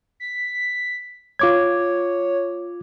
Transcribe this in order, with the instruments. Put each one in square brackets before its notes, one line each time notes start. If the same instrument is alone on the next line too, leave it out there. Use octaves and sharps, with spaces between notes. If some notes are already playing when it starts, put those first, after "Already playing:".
[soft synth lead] B6
[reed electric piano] F4 D6 G#6 [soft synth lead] C#5